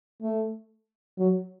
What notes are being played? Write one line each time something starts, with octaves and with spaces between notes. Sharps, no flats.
A3
F#3